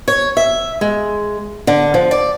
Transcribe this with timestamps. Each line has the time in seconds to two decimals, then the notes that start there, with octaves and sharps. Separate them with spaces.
0.08 C#5
0.37 E5
0.81 G#3
1.67 D3
1.94 F3
2.11 D5